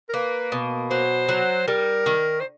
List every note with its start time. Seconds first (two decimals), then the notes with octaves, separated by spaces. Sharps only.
0.09 A#4
0.14 A#3 B4
0.52 B2
0.91 F#3 C5
1.29 F#3
1.68 G3 A#4
2.06 D#3
2.40 C5